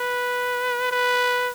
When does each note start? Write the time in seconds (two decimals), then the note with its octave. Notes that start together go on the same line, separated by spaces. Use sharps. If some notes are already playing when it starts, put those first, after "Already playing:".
Already playing: B4
0.91 B4